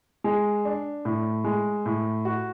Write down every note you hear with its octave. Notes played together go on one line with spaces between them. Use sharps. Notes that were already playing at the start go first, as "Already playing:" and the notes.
G#3
D4
A2
G#3
A2
F#4